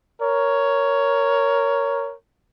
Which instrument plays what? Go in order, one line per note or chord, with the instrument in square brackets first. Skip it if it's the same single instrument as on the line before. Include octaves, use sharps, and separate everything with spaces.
[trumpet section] A#4 C#5